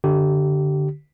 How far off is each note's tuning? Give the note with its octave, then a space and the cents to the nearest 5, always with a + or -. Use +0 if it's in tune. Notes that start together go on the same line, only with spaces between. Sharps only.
D3 -5 G4 -30